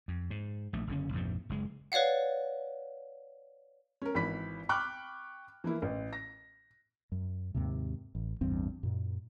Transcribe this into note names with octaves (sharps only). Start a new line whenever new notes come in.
F2
G#2
A#1 A3
F#1 D3 C#4
A#1 F2 G#2 C3
F#1 G#3
B4 C#5 D5 F5 F#5
C#4 A#4
G#1 E3 B5 B6
G5 B5 C#6 D6 F6 F#6
E3 A#3 E4
A1
A#6
F#2
D#2 G#2 C3
A1
A1 E2 G2 C4
F#2 A#2